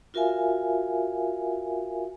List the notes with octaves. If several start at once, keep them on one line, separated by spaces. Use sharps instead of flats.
F4 F#4 A#4 E5 F5 G#5